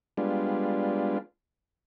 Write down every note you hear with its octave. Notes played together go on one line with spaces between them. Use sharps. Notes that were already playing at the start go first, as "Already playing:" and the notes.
G3 G#3 B3 D4 F4